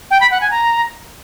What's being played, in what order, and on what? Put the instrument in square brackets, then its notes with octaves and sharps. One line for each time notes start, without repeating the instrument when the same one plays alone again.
[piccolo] G5
B5
F#5
G#5
A#5